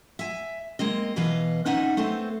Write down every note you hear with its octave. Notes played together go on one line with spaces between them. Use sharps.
E5 G#5
G#3 A#3 C4 D#5
B2 E3 B4 D#5 F5
C4 C#4 D#4 E5 F#5 G#5
A3 B3 C4 A4 C5